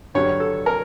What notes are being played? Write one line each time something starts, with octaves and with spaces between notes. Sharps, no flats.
G2 D3 F#3 C#5
A4
A#4